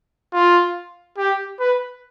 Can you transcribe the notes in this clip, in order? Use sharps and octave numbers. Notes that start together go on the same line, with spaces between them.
F4
G4
B4